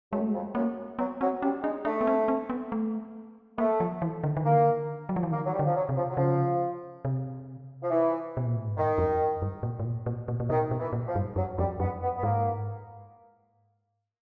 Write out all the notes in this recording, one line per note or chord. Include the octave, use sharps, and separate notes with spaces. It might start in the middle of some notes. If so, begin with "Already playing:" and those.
F#2 G#3
A3
F2 G#3
F#2 A#3
F#3 B3
F#3 C4
G3 C#4
G#3 D4
A3 D4
B3
C4
C4
B3
A3
A3 A#3
F3
E3
D3
D#3
D3 A#3
F#3
F3
E3
D#3 A#3
F#3
G3
D3
F3
F#3
C3
F3
F#3
C#3 F3
C3
F3
E3
B2
A#2
A2
G#2
G2 D#3
F2
G2
A#2
A2
A#2
A#2
A#2
A#2
B2 D#3
B2
E3
A#2
F3
G2
F#2 F#3
F2 G3
F#2 B3
B3
B3
G#2 A#3